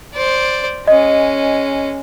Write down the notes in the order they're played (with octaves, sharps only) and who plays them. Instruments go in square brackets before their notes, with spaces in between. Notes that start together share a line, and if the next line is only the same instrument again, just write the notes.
[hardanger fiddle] C5 D5
[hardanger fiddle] G#3 C#4 [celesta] D#5